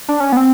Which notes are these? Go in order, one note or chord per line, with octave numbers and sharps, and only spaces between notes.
D4
C#4
B3
C4